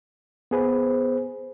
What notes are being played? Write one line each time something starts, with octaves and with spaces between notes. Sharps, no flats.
B3 G#4 B4 C5